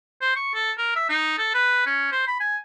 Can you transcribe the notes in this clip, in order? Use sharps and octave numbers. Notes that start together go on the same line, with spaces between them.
C5
C#6
A4
A#4
E5
D#4
A4
B4
C#4
C5
B5
G#5